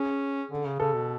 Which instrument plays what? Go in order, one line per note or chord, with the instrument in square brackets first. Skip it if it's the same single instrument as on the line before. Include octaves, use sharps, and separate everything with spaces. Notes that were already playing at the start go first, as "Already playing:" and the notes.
Already playing: [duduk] C#4 [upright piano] G#4
[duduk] D3
C#3
[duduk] C#3 [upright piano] A4
[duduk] B2